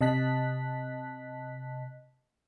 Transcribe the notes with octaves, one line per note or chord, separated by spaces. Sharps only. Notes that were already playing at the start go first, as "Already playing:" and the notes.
C3 D#5 A5 F#6 B6